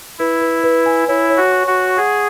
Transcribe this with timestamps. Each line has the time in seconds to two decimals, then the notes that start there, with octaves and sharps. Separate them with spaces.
0.19 E4 B4
0.41 B4
0.64 B4
0.86 G#5
1.08 E4 C#5
1.30 C#5
1.37 F#4
1.52 C#6
1.67 F#4
1.74 C#6
1.97 G#4 F#5